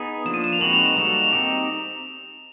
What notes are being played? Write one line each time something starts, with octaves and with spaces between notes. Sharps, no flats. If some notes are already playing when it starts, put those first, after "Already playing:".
Already playing: B3 D#4 G#4
F3 A#3 D4 E7
D#7
E7
F7
G#3 C4 D#4 F#4 B4 F#7
F7
E7
G3 A#3 D#4 F#4 A4 E7
F7
F7
C4 D#4 G4